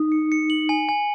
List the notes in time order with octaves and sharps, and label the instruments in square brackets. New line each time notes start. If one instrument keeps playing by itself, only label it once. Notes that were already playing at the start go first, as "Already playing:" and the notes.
Already playing: [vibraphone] D#4
[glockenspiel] C#7
C#7
F#7
G#5
G#5